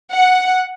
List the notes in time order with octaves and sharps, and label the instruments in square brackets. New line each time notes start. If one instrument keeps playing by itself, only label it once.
[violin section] F#5